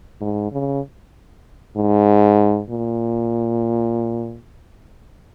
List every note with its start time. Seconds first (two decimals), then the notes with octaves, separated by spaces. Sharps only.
0.21 G#2
0.52 C#3
1.76 G#2
2.70 A#2